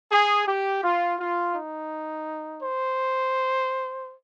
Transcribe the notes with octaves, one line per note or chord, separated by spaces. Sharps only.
G#4
G4
F4
F4
D#4
C5